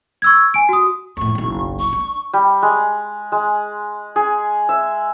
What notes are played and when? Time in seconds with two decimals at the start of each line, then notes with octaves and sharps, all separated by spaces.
0.22 C#6 E6 G#6
0.54 G#5 D7
0.69 F#4 D#6
1.17 F2 A2 C#6
1.35 F#1 B1
1.80 C#6
1.93 D4
2.33 G3
2.62 G#3
3.32 G#3
4.16 G#4
4.69 E5